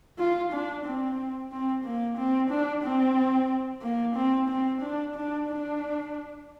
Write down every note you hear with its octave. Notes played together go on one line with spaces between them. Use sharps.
F4
D4
C4
C4
A#3
C4
D4
C4
A#3
C4
C4
D4
D4
D4